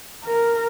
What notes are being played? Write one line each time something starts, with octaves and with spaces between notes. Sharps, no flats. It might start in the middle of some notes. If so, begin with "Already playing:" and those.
A#4